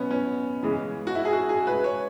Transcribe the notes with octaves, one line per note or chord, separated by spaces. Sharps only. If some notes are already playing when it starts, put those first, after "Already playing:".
Already playing: B2 F#3 B3 C#4
C#4
C#3 E3 G#3
F#4
E4
G#4
F#4
G#4
C#3 G#3 B4
C#5